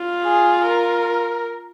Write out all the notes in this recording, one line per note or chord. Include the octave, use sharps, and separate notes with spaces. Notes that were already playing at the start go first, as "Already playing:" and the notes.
Already playing: F4
G#4
A#4